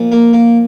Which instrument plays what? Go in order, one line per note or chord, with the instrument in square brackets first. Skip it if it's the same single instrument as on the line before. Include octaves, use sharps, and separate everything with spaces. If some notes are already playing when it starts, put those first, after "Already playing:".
Already playing: [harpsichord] A#2 F3
A#3
A#3